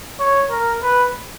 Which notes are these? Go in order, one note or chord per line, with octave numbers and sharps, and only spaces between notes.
C#5
A#4
B4